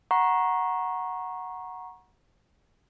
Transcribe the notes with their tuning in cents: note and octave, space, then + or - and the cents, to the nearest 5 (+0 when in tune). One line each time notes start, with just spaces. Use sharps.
F#5 -5 A#5 +20 C#6 -20